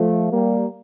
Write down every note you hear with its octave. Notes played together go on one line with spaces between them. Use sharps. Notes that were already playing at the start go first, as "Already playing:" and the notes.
Already playing: F3 A3
G3 A#3